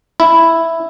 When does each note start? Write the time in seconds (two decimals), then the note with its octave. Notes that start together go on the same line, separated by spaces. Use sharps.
0.20 E4